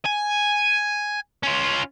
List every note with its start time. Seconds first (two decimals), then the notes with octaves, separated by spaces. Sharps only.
0.05 G#5
1.43 C#4 F4